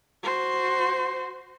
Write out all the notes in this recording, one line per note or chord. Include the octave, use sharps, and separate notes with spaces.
F#4 C5